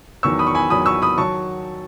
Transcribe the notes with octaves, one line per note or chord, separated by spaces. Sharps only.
E2 D#3 F#3 C#6 E6
B5 D#6
C#6
G#5 B5
E2 D#3 F#3 B5 D#6
C#6 E6
B5 D#6
D#3 F#3 A5 C#6